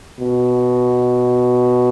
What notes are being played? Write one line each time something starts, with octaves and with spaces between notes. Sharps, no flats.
B2